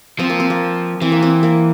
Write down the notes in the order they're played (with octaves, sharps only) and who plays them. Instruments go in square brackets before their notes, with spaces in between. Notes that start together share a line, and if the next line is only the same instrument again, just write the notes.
[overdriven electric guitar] F3 [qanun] C4
[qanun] A#3
C4
A#3
[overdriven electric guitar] E3 [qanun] C4
[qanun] A#3
C4
A#3